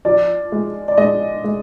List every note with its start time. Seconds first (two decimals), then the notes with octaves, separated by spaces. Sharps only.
0.05 F3 D5
0.52 G#3
0.88 D5
0.98 G#3 D#5
1.44 G#3